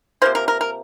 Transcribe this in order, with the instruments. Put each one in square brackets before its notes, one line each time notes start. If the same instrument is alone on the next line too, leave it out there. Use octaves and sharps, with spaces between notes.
[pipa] C3 F3 A#3 C5
A#4
A#4
A#4